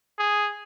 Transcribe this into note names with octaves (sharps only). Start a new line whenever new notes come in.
G#4